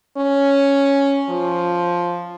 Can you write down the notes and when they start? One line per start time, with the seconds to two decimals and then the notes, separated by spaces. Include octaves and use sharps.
0.17 C#4
1.30 F3